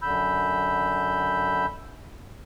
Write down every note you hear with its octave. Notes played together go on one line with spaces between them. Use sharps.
F#2 D3 B5 E6 G6